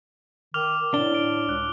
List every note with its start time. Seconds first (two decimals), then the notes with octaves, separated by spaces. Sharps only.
0.54 D#3 D6 F6 F7
0.94 A2 D4 G7
1.14 D7
1.49 C#2 F#6